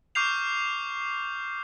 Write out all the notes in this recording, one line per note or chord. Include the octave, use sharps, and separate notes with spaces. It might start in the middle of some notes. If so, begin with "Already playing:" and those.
C#6 D6 F6 G6 C7 F7